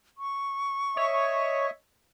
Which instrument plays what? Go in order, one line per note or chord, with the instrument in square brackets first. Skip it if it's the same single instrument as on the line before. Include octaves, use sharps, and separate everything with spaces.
[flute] C#6
[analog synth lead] C#5 [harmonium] D#5 E5